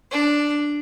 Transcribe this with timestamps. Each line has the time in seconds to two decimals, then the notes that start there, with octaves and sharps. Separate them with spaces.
0.11 D4